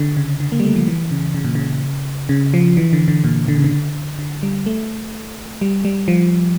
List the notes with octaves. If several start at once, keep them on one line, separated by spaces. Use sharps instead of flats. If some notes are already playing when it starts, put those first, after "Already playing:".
Already playing: D3
C#3
D3
A#3
G3
A3
F3
E3
C#3
C#3
A#2
C#3
C#3
F3
E3
D3
D3
A#2
D3
C#3
D3
D3
G3
A3
G3
G3
F3